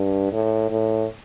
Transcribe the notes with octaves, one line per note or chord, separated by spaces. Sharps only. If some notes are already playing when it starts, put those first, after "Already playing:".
Already playing: G2
A2
A2